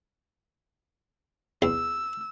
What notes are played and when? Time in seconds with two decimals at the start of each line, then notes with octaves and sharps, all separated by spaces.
1.62 E2 E6